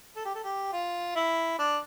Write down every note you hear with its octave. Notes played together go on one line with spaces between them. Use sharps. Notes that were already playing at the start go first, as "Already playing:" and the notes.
A4
G4
A4
G4
F4
E4
D4